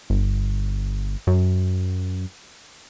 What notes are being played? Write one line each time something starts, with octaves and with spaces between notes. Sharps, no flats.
G1
F#2